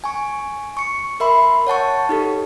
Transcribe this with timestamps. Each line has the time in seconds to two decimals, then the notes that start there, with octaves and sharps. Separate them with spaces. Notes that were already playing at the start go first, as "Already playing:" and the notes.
0.04 G#5 C#6
0.77 C#6 C#7
1.20 A#4 E5 B5 C6
1.67 C#5 F#5 A5 C#6
2.09 D#4 G4 A4